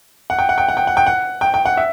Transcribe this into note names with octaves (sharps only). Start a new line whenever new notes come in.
F#5
G5
F#5
G5
F#5
G5
F#5
G5
F#5
G5
G5
F#5
E5